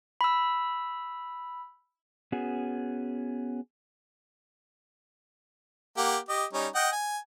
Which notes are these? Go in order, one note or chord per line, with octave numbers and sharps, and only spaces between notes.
B5 E6
B3 C#4 F#4 G#4
A#3 G4 F#5
G4 D#5
G3 C#4 D#4
D#5 F#5 G5
G#5